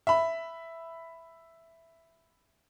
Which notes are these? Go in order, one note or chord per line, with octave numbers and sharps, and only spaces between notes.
E5 B5